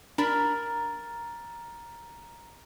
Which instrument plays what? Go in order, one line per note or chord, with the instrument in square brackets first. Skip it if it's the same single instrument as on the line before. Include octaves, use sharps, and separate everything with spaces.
[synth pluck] D4 B5 [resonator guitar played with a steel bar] A#4 [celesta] A#5 F6 A6